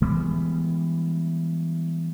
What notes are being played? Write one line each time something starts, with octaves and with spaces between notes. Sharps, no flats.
E3 G3 G#3 B3